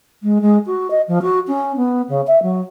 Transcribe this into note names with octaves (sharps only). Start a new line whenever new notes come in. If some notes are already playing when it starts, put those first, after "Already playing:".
G#3
G#3
F#4
D#5
F3
F#4
C#4
B3
C#3
E5
F#3